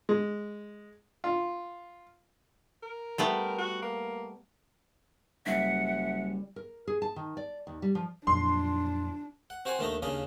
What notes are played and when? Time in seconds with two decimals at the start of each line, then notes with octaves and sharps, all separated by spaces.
0.09 G#3
1.24 F4
2.83 A#4
3.18 G3 A3 B3
3.58 F#4
3.82 A#3
5.46 F#1 G3 E5 F#5
6.56 A#4
6.87 G#4
7.02 A5
7.16 D#3
7.37 D5
7.67 D#2
7.82 G3
7.95 F3
8.27 F2 A#2 F#3 D4 C6
9.50 F#5
9.65 C4 F#4 C5 F#5 G#5
9.79 D#2 D#3 A3 D4 D#4 A#5
10.02 D#2 C#3 A#3 D4 D#5